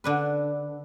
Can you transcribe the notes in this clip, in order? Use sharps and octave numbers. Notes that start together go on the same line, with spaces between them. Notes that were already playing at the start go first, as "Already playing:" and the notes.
D3 D4 B4